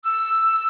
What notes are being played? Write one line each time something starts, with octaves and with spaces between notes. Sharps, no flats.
E6